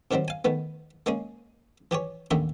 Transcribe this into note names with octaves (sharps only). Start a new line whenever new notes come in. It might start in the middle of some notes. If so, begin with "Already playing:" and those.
C3 D#3 F#3 G3 C4
F5 G#5
D#3 A3 B3
G#3 A#3 C#4 G#4
E3 G4 G#4 C#5
A1 D#2 D3 D#3 D#5 E5